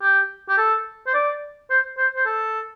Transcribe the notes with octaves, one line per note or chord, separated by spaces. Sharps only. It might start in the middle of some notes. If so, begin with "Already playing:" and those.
G4
G4
A4
C5
D5
C5
C5
C5
A4